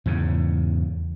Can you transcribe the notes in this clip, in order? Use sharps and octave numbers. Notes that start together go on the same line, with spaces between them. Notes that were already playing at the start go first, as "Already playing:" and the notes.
E2 G#2 C#3